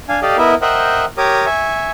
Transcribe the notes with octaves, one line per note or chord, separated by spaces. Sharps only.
D4 F5 G#5
G4 A4 D5 D#5 F5
B3 E4 A#4 D#5 E5
A#4 C5 D#5 E5 F#5 G5
G4 A#4 C#5 A#5 D6 D#6
E5 G#5 C#6